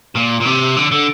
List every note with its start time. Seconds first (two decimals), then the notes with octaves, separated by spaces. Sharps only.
0.16 A#2
0.41 A#2
0.46 C3
0.77 D3
0.92 D3